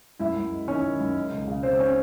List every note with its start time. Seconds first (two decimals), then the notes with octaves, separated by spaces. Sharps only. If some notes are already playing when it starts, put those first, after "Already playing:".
0.20 F#2 E4 E5
0.36 F#2
0.52 G#3
0.68 D#3 C#4 C#5
0.84 D#3
1.00 F#2
1.15 G#3
1.32 C#2
1.47 C#3
1.63 C#3 C4 C5
1.79 C#4 C#5